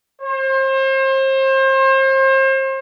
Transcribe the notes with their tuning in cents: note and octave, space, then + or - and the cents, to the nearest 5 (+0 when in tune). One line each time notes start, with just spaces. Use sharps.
C5 +35